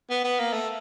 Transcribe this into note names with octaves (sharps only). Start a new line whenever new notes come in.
B3
B3
A#3
A3